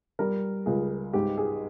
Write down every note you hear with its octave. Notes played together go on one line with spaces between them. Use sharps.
G3 A#4
C#2 G#4
G#2 G4
G#4